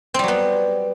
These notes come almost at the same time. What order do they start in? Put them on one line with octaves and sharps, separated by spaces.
C4 G3 F#3 B3